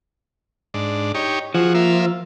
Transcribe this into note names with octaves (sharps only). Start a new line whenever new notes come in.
G#2 D4
D#4 G4 C#5
F3 F#4 G#4
A#3 F4 E5